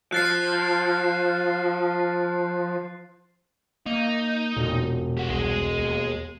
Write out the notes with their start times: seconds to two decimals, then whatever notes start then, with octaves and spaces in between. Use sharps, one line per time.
0.12 F3 F#6 A6 C7
3.86 A#3 D#4
4.57 E1 A#2
5.17 G4 F#5
5.30 C2 G#4 D#5
5.79 D#2